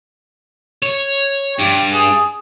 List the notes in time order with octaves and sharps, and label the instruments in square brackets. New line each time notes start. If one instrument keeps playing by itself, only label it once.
[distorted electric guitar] C#5
[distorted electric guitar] G2 [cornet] G4
[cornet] G#4